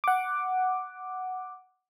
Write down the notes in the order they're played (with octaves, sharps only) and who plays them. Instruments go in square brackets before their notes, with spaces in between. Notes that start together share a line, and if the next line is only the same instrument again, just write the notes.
[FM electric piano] F#5 D6